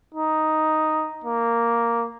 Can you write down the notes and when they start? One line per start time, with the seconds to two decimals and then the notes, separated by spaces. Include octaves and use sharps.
0.14 D#4
1.24 A#3